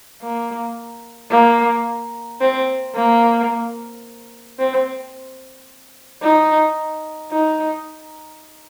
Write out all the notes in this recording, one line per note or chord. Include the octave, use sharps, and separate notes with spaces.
A#3
A#3
C4
A#3
C4
D#4
D#4